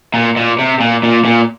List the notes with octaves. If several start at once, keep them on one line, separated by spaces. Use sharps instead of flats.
A#2
A#2
C3
A#2
A#2
A#2